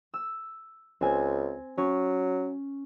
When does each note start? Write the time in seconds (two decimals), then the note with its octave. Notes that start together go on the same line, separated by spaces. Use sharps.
0.14 E6
1.01 C#2 C4 G#5
1.78 F#3 C#4